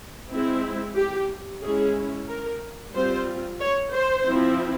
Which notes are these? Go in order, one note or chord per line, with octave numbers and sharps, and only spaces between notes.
G#3 C4 E4
G4
G#3 C#4 E4 G#4
A#4
G3 C4 F4 C5
C#5
C5
F3 C4 E4